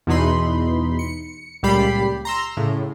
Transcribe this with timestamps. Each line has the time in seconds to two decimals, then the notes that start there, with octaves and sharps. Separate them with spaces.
0.07 E2 B2 E3 D#4 B5 C6
0.99 C#7
1.63 C#2 A#2 G3 G4 B5 C7
2.25 A#5 C6 E6
2.57 A2 C#3